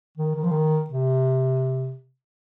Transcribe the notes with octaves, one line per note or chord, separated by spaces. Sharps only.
D#3
D#3
F3
D#3
C3